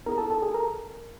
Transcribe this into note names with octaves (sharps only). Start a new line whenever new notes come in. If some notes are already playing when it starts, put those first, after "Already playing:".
B3 E4 G#4 A#4 A#5
A4 A5
A4 A5
G#4 G#5
A#4 A#5